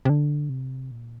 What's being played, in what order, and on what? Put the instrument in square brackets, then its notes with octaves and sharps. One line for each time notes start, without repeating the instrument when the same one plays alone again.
[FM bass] C3
D3
C3
A#2